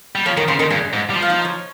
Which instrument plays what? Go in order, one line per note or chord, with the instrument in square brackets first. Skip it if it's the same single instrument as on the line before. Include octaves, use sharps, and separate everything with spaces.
[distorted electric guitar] G3
[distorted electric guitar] F3 [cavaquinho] C#5
[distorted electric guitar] D#3 [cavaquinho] A#4 A#5
[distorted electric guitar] C#3 [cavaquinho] C5 C6
[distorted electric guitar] D#3 [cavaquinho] A#4 A#5
[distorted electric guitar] G2 [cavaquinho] G#4 G#5
[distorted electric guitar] G#2
G3
F3
[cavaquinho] F5
D#4 D#5
C#5